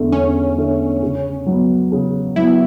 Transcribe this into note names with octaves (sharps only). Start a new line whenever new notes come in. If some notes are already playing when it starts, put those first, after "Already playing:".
Already playing: E2 D3 A3
E2 C#4
D3 A3
C#3
F#3
B3
C#3
F#3 B3 E4